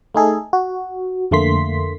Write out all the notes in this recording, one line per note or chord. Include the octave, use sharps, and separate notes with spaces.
A3 D#4 G#4 A4
F#4
F2 D3 A3 A#3 C6 B6